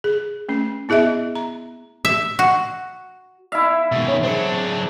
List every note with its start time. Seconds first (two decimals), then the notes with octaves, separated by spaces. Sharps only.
0.04 G#4
0.49 A3 C#4
0.89 B3 E4 G#4 D#5 E5
1.35 A#5
2.05 E5
2.39 F#4
3.52 E4 E5 F5
3.92 G#2 B2 D#3
4.08 C#4
4.24 F#3 C4 D4 G#4 C#6